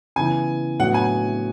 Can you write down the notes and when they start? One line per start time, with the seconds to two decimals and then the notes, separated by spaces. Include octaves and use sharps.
0.16 C#3 E3 B3 E4 G#5
0.79 A2 F#3 B3 D4 F#5
0.94 G#5